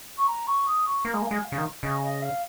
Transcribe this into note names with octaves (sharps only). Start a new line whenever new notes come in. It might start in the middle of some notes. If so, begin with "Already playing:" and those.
C#6
A#5
C#6
D#6
C#6
A#3 A#5
G#3
A#3
G#5
G#3
F5
C#3
D#3
C#3 D#5
D#5
F5